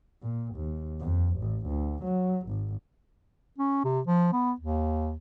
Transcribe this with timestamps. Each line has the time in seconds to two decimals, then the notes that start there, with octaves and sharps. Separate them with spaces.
0.22 A#2
0.55 D#2
0.99 F2
1.37 A1
1.68 D2
2.04 F#3
2.48 G#1
3.58 C#4
3.84 C3
4.07 F3
4.32 B3
4.60 D#2